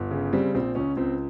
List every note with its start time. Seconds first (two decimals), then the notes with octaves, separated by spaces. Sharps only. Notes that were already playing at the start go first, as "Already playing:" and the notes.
Already playing: G1
0.11 C#3
0.33 G3 C4
0.54 A#1 C4
0.75 C#2 C#4
0.97 C#2 C4